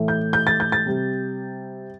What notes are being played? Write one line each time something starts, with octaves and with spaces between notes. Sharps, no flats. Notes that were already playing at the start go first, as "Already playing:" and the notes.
Already playing: A2 E3 A3
G6
G6
A6
G6
A6
C3 G3